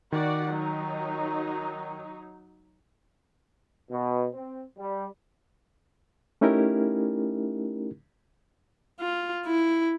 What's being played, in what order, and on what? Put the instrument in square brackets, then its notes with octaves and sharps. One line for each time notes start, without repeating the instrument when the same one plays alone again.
[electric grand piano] D#3 [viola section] F#4 D5 F#5
[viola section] F#3 D#4
[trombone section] B2
C4
G3
[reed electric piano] A3 C#4 D#4 E4 G4 A#4
[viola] F4
E4